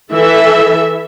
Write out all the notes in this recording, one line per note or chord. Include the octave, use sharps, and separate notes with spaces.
E3 A4 E5